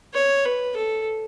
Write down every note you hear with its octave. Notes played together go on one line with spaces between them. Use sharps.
C#5
B4
A4